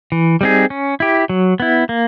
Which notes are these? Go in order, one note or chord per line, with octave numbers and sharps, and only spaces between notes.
E3
G3 C4 D#4 G#4
C#4
E4 G4
F#3
B3 E4
A#3